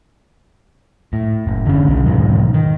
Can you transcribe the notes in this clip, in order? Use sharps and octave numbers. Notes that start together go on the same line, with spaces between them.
A2
F#1
D3 C#4
B1 C#3
B1 E2 G#2 D#3
D#3